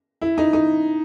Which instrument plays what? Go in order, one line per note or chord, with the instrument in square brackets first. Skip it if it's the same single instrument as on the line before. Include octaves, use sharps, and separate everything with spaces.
[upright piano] E4
D#4
D#4